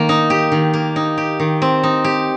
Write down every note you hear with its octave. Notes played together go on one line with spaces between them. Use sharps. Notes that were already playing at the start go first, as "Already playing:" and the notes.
Already playing: D#3 A#3
D#4
G4
D#3
A#3
D#4
G4
D#3
C4
D#4
G4